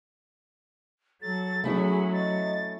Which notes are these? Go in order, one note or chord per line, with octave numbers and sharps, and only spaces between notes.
F#3 A4 A6
F#3 A3 C#4 E4 G#4 B5
D#5 A6